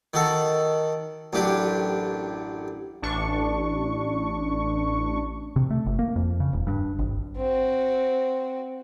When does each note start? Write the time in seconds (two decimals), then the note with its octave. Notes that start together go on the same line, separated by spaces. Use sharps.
0.14 D#3 F#4 A4
1.33 A1 F#2 D4 G4
3.02 A1 D4 C#6
5.56 C3
5.70 A3
5.86 G1
5.99 A#3
6.16 F2
6.40 C#3
6.53 D#1
6.67 G2
6.99 G#1
7.37 C4 F#4